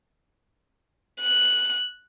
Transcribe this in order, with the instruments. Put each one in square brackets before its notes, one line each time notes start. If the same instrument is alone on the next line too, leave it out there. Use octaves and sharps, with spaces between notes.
[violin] F#6